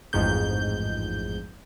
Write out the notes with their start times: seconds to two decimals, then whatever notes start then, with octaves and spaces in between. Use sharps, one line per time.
0.13 A1 F2 G#2 G6